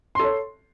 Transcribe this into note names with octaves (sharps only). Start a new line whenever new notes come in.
A4 C#5 C6